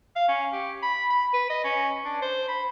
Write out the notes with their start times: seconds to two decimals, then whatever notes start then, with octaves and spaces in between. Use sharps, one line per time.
0.16 F5
0.28 C#4
0.53 G4
0.82 B5
1.10 B5
1.33 B4
1.50 D#5
1.64 C#4
2.05 D4
2.22 C5
2.48 B5